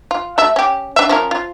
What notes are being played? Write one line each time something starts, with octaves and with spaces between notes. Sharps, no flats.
F4
A3 F#4 E5
C#4 G4
D4 E5
F3 C#4 A#4
F4